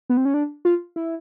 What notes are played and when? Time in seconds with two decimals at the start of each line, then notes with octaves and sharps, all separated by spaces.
0.10 B3
0.17 C4
0.25 C#4
0.34 D4
0.65 F4
0.96 E4